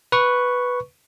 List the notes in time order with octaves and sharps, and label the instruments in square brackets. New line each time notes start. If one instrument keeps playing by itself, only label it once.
[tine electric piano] B4 C#6